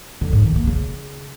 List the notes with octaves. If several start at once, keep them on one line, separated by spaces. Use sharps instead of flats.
D3
G#2
D#3
A#3
C#3